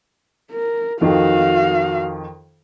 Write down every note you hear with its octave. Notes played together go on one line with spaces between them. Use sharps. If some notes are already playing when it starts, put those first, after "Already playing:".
A#4
F2 D#3 F#4 F5